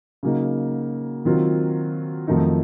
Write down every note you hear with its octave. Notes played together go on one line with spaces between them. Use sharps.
C#3 F#3 A#3 D#4
D#3 F#3 C4 F4
F2 D#3 F#3 A3 D#4